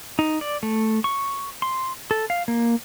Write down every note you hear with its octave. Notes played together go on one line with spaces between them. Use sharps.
D#4
D5
A3
C#6
C6
A4
F5
A#3